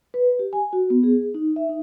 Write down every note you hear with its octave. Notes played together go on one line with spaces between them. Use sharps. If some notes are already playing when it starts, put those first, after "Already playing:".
B4
G4
G#5
F#4
B3
G#4
D#4
E5
D#4